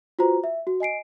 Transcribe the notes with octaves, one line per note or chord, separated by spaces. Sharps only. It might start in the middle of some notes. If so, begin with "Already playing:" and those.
F4 F#4 B4 C5 A#5
E5
F#4
D#5 G#5 C7 D7